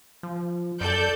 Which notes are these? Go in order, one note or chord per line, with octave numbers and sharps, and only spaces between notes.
F3
F#2 A4 D5 G6